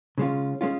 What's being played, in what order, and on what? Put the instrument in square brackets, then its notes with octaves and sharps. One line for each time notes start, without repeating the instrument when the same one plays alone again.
[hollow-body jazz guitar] C#3 G#3 C#4 F4
G#3 C#4 F4